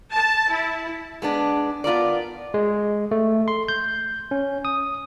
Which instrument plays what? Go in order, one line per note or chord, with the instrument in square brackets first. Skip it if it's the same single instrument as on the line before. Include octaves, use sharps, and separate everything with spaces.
[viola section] A5
E4
[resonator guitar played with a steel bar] G#3 B3 D4
B3 F4 A#4 D5
[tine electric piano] G#3
A3
C6
G6
C#4
D#6